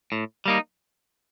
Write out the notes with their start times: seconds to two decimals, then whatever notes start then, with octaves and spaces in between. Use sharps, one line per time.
0.12 A2
0.46 G3 A#3 D#4